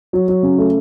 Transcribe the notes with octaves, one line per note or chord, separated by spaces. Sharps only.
F#3
F#3
C#3
A3